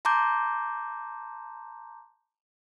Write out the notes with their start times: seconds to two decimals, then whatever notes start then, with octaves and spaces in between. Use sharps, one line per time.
0.05 A5 A#5 C6 D6 G6